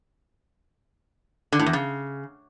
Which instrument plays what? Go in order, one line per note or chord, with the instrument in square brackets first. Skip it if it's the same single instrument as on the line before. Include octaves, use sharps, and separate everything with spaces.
[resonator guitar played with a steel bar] D3
A2
E2
C#3